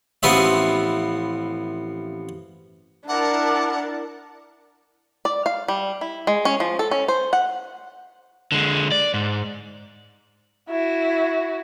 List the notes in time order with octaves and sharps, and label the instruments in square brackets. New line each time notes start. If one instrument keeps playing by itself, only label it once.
[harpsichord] A1 F3 B3 C4 E5
[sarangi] D4 [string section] E4 A#4 A5 [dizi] F#5 [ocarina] D6
[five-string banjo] D5
F5
G3
E4
G#3
C#4
F3
A4
C#4
C5
F#5
[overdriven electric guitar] D3 G#3
D5
G#2
[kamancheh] E4 F#4